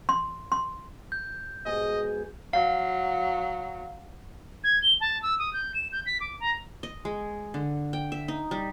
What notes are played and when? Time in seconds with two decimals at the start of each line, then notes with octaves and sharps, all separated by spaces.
0.09 C6
0.52 C6
1.12 G6
1.66 G#2 B2 G#4 D#5
2.53 F#3 F5
4.64 G#6
4.82 G7
5.01 A5
5.22 E6
5.39 D#6
5.53 G6
5.74 E7
5.92 G6
6.06 B6
6.20 D6
6.40 A#5
6.83 D#5
7.05 G#3
7.54 D3
7.93 G5
8.12 E5
8.28 D#4
8.51 G3